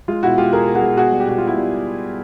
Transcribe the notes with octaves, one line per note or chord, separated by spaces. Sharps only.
G#3 F4
B2 E4 F#4
G#3 F4 G4
B2 G#4 A#4
B2
F#4 G#4
G#3
B2 F#4 G#4
G3
G4
B2 F#4
F4
B2 E4 F#4
G3